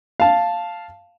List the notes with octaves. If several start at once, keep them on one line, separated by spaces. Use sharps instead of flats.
F5 A5